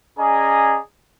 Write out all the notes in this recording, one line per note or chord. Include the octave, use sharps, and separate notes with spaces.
C#4 G#4 D5 D#5 G#5 A#5